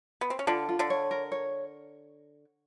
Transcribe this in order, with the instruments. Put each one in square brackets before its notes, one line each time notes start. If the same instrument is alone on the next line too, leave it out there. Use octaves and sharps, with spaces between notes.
[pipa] B3
C4
C#4
[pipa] D3 D4 [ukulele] F4
[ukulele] F4
[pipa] D3 D4
[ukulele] C#5
A#4
C#5